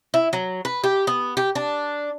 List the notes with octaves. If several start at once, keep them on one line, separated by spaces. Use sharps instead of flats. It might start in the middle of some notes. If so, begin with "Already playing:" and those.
E4
F#3
B4
G4
B3
G4
D4